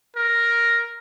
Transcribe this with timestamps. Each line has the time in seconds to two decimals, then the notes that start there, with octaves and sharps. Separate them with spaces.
0.16 A#4